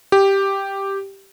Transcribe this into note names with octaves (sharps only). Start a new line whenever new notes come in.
G4